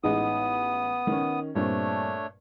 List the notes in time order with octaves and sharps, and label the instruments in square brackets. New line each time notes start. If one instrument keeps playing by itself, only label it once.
[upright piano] A1 G#3 D#4 [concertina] B3 D#6
[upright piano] D#3 C#4
[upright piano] G2 A#2 C4 [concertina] A3 D4 C#5